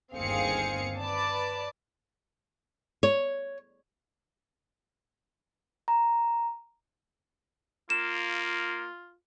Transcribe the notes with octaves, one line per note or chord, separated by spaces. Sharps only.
G1 D#2 C4 G#4 F5 C#7
B4 D5 A5
C#5
A#5
A#3 F4 E7